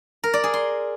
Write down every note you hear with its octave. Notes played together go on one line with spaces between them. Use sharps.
A#4
D5
G#4
C6